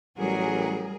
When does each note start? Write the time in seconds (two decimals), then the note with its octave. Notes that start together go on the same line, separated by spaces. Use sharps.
0.18 A1 F#3 G3 G#4 A#4